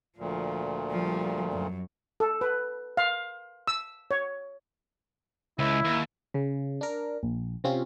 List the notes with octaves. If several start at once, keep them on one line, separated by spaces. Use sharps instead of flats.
D2 A#2 F3
F3 G3
F#2
A4
B4
F5
E6
C#5
C#2 E4
D#2
C#3
D4 A#4
A#1
C3 C4 C#4 F4